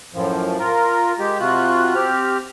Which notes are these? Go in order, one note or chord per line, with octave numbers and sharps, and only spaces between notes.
F#2 A2 F3
F4 A#4
G#3 G4
C3 F4 F#4 F#6
C4 G4 F6